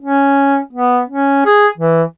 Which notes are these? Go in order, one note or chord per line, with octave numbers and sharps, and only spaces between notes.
C#4
B3
C#4
G#4
E3